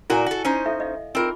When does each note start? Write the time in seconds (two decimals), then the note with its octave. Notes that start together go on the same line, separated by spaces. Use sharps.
0.10 A#2 E4 F#4 A#4 G#5
0.26 F#4 A4
0.45 C#4 D#4 C5
0.66 A4 E5 F5
0.80 D#5 F5
1.15 C4 D#4 F4 G#4 A#4